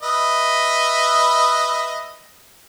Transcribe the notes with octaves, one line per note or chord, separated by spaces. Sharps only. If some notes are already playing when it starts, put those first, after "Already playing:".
B4 D#5 E5